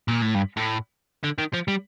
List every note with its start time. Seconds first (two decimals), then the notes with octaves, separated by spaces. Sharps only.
0.08 A#2
0.22 A2
0.35 G2
0.57 A2
1.23 D3
1.38 D#3
1.53 F3
1.68 G3